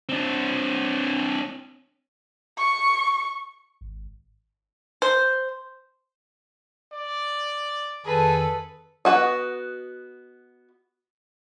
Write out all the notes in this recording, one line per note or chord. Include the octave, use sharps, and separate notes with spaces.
C4 D4
C#6
G#1
C5
D5
F2 D#3 G#4 A4 B4
B3 F#4 D#5